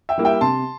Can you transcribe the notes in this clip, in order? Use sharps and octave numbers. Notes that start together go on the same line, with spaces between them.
E5 G5
G3 A#3 E4
E5 G5
C3 A5 C6